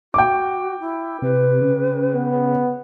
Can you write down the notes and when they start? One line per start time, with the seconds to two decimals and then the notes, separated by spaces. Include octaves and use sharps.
0.14 F#4 G5 D6
0.80 E4
1.22 C3 B4
1.61 C#3
2.15 B3